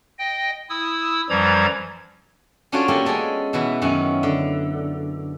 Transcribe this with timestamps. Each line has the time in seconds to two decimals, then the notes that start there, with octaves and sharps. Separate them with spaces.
0.19 D#5 G5
0.70 E4 D#6 E6
1.30 F#2 E3 F3 G3 A#5 G#6
2.72 C#4 D4 F4 F#4 A4 C#5
2.88 A#3 B3 C#4 G4 A4
3.05 G#3 C#4 G#4 A4 D5
3.53 B2 E3 B3 B5
3.82 F#2 D#3 C#4 E4 F#5
4.23 D3